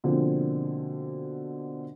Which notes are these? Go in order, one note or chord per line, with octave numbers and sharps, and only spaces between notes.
B2 D3 F3 A#3 C4